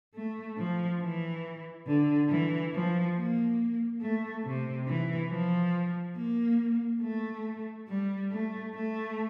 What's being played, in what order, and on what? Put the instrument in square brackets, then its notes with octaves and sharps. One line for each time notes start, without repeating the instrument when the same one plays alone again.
[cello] A3
F3
E3
D3
E3
F3
A#3
A3
C3
E3
F3
A#3
A3
G3
A3
A3